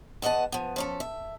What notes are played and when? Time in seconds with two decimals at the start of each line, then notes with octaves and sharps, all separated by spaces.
0.22 E2 B3 D#5 F#5 A5
0.52 F3 B3
0.76 F3 C#4 A4
1.00 E5